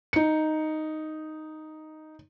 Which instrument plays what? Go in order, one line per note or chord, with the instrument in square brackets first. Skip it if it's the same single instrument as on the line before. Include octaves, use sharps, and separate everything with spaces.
[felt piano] D#4 C#7